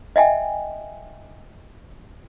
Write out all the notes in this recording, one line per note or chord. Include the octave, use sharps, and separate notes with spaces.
D#5 E5 G5 G#5